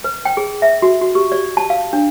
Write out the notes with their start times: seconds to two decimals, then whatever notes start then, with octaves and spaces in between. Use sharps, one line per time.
0.04 B4
0.25 G5
0.37 G#4
0.62 E5
0.82 F#4
1.02 F#4
1.15 G4
1.32 D5
1.57 A5
1.70 F5
1.93 D4